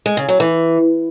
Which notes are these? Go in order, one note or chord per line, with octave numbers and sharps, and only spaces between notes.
G#3
C#3
F#3
E3